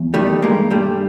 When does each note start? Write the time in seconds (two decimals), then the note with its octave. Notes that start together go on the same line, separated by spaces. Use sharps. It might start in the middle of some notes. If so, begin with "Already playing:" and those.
Already playing: E2
0.14 D#3 G3 A3
0.42 G2 G#3 A#3
0.70 G2 G3 A3